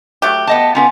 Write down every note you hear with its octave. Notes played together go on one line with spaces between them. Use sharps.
F#3 A3 G4
B3 D#5 A5
B3 C#4 F4